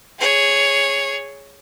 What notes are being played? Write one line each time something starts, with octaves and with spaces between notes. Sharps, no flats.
G#4 C#5